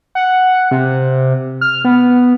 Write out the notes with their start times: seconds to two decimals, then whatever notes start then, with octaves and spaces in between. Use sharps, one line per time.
0.15 F#5
0.71 C3
1.61 F6
1.84 B3